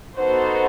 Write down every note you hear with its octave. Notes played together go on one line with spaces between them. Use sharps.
B3 D#4 F#4 A4 C5